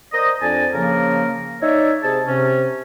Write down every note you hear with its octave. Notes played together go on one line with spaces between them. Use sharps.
A#4 C5 D5 D#5
F2 D4 D5 G#5 A5
C#3 F3 A#3 A#4
D#4 C#5 D5 E5
C3 G#4 A5
C3 C#4